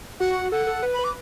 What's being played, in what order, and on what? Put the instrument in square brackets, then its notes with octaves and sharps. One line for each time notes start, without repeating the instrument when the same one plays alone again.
[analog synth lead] F#4 [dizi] F#5
[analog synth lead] A4 [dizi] F#5
[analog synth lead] A4
B4
[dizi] B5
[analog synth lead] B4
[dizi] D6